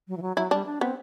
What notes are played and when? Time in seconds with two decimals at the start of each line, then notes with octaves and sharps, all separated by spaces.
0.08 F#3
0.17 E3
0.22 F#3
0.36 F#3 E4
0.51 G3 D4
0.66 D4
0.81 B3 C4